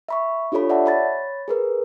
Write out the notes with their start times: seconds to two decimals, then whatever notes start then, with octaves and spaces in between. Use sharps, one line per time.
0.09 E5 B5 C#6
0.52 D4 F4 G4 A4 C#5 B5
0.70 D5 E5 F#5 A5
0.86 C#5 B5 A6
1.48 G#4 A#4 B4